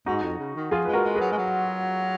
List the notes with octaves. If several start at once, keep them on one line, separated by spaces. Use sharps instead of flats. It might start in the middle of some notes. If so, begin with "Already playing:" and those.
G#2 D#4 F#4
F2
C#3
D#3
F3 F4 G#4
G#3 B4
F#4 A#4
G#3
F#3 G#4 B4
G#3
F#3